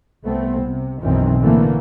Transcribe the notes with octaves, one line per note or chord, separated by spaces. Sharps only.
C2 A3 B3 C4
C3
B1 F#2 D#3 E3 C4
A2 D3 E3 A3 A#3